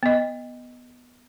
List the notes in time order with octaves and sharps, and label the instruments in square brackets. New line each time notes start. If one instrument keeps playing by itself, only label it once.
[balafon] B3 D#5